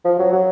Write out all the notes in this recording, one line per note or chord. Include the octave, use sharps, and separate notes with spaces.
F3
F#3
F#3